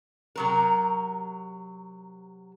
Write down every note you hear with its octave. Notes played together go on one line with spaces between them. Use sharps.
C3 F#3 A#4